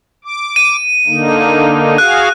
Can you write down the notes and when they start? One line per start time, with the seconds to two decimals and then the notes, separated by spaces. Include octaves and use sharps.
0.24 D6
0.56 D#7
1.07 D3 A#3 D#4
1.98 F#4 G#4 F5 F#6